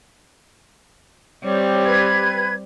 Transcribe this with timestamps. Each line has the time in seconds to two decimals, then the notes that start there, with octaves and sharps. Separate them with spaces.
1.44 G3 C4 G4 C#5
1.86 B4 G#6